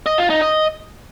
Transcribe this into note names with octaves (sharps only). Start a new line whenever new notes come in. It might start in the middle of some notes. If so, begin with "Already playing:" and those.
D#5
F4
D#4
D#5